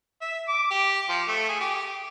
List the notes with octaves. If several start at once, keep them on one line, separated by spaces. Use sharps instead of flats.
E5
D6
G4
F3
A3
G#4
G4